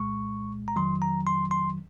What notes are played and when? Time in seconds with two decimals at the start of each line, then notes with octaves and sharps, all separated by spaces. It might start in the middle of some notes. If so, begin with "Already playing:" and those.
Already playing: C2 A#2 G#3 C#6
0.68 A#5
0.76 F2 D#3 F#3 C6
1.02 A#5
1.27 C6
1.51 C6